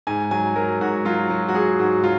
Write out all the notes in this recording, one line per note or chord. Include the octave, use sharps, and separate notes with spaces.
G#2 G#5
F#3 G#5
F#3 A#4
G#2 F#4
F#3 F4
F#3
F#4
F#3 G#4
G#2 F#4
F#3 F4